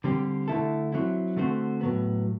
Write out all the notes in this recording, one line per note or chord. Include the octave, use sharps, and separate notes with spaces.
D3 G3 C4 G4
D3 A3 E4 A4
F#3 C4 E4
D3 A3 C4 F#4
A2 F#3 B3